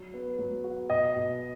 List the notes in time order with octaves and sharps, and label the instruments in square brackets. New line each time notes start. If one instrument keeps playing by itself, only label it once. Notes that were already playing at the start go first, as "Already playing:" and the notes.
Already playing: [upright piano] F#3
B3
F#3
F#4
[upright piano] B2 [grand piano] D#5
[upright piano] B2